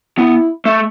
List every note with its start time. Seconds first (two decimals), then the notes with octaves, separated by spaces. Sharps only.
0.18 B3 E4
0.65 A3